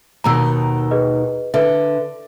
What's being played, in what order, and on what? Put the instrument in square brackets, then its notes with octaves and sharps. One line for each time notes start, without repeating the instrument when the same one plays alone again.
[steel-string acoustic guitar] D#2 B2 D#3 [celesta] A#5 E6
[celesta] G#4 B4 D#5
[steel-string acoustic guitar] D3 [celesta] B4 E5